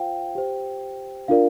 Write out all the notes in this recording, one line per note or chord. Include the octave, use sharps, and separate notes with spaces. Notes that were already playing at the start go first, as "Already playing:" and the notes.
Already playing: F4 C5 F5 G5
G4 C5
D4 F4 A#4 D5 F5